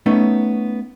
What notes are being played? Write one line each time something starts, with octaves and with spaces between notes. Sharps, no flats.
A3 B3 C#4 D#4